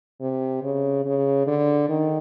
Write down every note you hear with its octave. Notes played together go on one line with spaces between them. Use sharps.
C3
C#3
C#3
D3
D#3